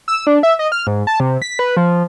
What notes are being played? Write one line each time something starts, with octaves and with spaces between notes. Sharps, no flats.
E6
D4
E5
D#5
F6
G#2
A5
C3
B6
B4
F3